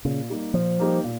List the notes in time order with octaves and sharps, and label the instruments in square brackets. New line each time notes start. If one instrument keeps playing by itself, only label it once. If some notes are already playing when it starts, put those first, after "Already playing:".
[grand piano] A#2 [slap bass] C#3
[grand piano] G3 A#3 D#4 G4
[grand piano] A#2 [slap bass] F3
[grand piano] G3 A#3 D#4 G4
A#2